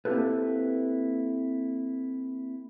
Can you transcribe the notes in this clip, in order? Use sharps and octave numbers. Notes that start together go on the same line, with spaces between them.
A#3 C4 E4 G4 A4 B4